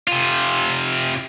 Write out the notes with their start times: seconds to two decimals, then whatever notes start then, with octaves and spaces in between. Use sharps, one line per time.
0.07 C3 F4